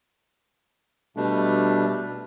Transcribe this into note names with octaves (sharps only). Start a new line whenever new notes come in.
B2 G3 A3 D4